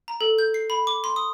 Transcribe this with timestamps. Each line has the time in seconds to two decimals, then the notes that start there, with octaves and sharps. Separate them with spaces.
0.08 A#5
0.21 A4
0.39 G6
0.54 C7
0.70 B5
0.87 D6
1.04 C6
1.16 D#6